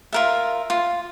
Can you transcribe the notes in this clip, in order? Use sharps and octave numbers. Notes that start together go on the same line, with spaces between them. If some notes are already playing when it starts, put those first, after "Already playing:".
F4 A#4 E5
F4